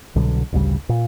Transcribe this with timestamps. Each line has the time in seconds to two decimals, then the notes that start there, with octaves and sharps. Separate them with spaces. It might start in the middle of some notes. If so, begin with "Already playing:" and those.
0.15 C2 B2 D3 F#3
0.52 A1 D2 C#3 G3
0.89 A#2